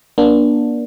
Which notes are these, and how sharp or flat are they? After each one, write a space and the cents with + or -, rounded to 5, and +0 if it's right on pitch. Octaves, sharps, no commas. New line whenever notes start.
A#3 +45 D4 +0